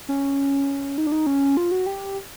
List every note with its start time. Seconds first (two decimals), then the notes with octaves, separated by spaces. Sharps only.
0.09 C#4
0.98 D#4
1.07 D4
1.12 D#4
1.27 C#4
1.57 F4
1.72 F#4
1.86 G4